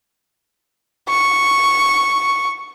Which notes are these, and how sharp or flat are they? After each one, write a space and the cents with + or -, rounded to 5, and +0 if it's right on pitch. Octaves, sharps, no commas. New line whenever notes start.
C#6 +0